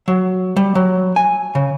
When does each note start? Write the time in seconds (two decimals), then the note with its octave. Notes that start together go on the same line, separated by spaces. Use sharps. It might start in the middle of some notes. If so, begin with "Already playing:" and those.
0.08 F#3
0.56 G3
0.75 F#3
1.16 G#5
1.55 C#3